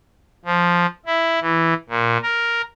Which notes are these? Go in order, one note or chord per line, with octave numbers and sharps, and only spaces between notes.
F3
E4
E3
A#2
A#4